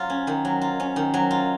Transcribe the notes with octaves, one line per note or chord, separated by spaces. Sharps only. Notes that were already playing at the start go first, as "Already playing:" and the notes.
Already playing: F#3 F4
C#4
D#3
F#3
F4
C#4
D#3
F#3
F4